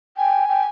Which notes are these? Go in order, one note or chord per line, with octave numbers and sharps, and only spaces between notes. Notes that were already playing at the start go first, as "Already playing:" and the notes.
G5 G#5
G5